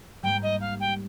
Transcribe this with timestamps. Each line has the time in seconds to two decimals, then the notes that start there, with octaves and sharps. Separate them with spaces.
0.23 G#2 G3 A#3 G5
0.43 D#5
0.61 F5
0.80 G5